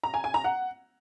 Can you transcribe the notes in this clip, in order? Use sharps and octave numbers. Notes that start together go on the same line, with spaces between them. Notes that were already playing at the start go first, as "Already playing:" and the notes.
A#5
G#5
G#5
A#5
F#5